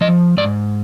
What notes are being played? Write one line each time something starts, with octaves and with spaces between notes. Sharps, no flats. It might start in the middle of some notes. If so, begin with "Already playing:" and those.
F3 D#5
G#2 D5